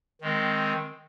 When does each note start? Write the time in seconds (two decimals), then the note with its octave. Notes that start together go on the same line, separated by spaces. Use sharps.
0.21 D#3 G#3 C4